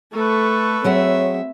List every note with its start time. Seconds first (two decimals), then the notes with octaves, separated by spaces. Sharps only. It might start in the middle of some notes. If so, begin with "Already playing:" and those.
0.13 A3 A4 B4 C#6
0.84 F#3 C4 G#4 C#5 E5 F#5